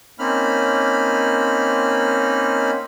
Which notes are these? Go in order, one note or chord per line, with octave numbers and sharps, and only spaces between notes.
A#3 C4 C#4 D#4 B5 F6